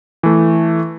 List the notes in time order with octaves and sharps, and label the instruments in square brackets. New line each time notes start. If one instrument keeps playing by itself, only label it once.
[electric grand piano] E3 A3